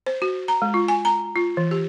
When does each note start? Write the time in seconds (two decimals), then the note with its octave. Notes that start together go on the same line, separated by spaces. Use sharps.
0.06 C5
0.22 F#4
0.48 A#5
0.62 G#3
0.74 F4
0.88 G#5
1.05 A#5
1.36 F4
1.57 E3
1.71 G4